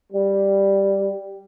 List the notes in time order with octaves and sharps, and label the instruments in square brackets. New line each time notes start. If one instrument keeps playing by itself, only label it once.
[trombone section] G3